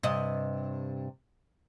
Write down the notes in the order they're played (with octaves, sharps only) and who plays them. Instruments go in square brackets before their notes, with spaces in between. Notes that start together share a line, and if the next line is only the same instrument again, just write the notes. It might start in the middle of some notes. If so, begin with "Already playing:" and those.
[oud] G2 C3 D#5